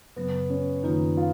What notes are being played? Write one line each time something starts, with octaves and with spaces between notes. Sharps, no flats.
F#2 C#3 F#3 B3
C#4
F#2 D#3 A#3 D#4 F4
F4